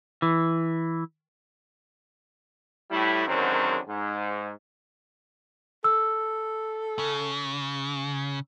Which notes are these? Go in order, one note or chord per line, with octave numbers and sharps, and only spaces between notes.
E3
A2 G3 E4
F#2 D3 D#3 F#3 G#3 C4
G#2
A4 E6
C#3